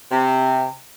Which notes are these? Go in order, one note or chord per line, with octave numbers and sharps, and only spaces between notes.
C3